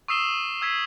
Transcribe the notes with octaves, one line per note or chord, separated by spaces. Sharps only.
C#6 D#6 E6 C7 E7 G7
E6 G#6 B6 C7